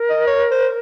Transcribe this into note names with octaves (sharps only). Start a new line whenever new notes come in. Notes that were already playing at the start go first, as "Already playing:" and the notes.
Already playing: A#4
D#5
C#5
C5